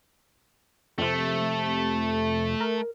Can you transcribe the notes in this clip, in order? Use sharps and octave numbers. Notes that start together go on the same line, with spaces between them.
F2 C3 A3
A#4